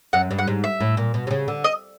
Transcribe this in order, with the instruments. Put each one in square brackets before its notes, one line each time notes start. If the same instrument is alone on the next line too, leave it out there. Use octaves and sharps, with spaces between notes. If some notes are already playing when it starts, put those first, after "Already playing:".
[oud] F#2 [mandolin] F#5
[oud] G2
[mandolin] F#5
[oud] G#2
[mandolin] E5
[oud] A2
A#2
B2
C3
C#3
D3
[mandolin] D#5